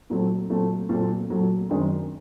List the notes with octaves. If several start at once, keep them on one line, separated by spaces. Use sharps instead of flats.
A#2 F#3 A3 C4
A#2 F#3 A3 C4
A#2 F#3 A3 C4
A#2 F#3 A3 C4
F#2 D#3 G#3 C4